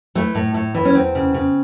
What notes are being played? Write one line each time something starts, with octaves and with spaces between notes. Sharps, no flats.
E3 A3
A2
A2
E3
C#4
E2 C4
C#3
C#3